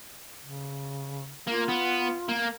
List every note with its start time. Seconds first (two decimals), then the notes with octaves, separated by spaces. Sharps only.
0.41 C#3
1.48 A#3 F4
1.69 B3
2.29 A#3